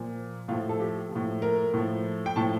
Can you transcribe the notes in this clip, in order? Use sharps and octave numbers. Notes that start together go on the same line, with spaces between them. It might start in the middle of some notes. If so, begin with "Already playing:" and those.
Already playing: A#2 F3
A2 F3 F4
A4
G4
A2 F3
A#4
A2 F3
G5
A2 F3 A5